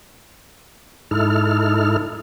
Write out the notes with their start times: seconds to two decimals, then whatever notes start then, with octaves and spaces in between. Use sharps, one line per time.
1.11 G#2 D#4 E4 A4 F6